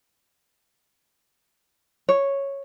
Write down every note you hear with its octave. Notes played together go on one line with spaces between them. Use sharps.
C#5